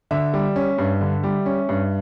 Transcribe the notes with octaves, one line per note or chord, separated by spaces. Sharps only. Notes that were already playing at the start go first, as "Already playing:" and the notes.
D3 E5
G3
C#4
G2
D3
G3
C#4
G2